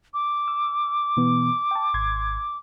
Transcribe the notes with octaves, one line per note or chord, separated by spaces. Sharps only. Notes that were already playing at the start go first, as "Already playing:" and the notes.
D6
E6
B2 E3 B3
G5 A5
G#1 C6 G#6